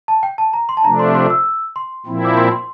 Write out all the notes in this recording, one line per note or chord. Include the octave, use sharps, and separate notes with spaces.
A5
G5
A5
A#5
C6
A5
C3 F3 A3 D4 A#5
C6
C6
E6
C6
A#2 F3 C4 E4
D6
C6
C6